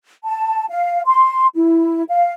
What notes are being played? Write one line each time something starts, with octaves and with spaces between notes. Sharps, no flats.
A5
F5
C6
E4
F5